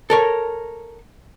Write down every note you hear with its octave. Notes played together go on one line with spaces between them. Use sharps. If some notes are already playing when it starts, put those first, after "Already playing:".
A4 A#4 C#5